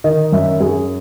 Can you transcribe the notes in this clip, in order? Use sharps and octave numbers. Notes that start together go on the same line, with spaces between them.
D#3 D#5
F#2 E5
F#2 G#4